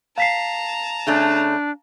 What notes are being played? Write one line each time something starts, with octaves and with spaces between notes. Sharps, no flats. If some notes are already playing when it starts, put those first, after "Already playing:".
F5 A5 A#5 B6 C7
C#3 A3 C#4 D4